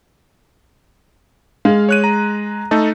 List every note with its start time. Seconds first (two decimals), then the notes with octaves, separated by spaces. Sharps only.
1.65 G#3 F5
1.89 C#5 F#6 D#7
2.04 A#5
2.71 A3 D#4 A4